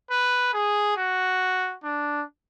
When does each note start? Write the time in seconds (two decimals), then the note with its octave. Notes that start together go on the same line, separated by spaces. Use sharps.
0.10 B4
0.53 G#4
0.97 F#4
1.83 D4